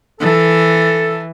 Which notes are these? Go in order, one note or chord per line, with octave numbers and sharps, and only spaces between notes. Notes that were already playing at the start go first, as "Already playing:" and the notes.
E3 A4